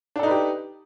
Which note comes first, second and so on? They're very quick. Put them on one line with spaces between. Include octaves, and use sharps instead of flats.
D4 A4 D#4 B4 G4